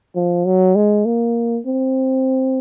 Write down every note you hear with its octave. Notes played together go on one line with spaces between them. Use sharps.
F3
F#3
G#3
A#3
C4